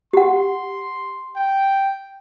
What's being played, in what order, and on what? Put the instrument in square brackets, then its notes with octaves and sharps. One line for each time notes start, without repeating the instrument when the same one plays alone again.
[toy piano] G4 F#5 [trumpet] C6
[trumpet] G5